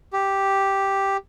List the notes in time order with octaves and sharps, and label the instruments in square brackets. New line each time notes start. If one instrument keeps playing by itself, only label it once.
[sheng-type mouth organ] G4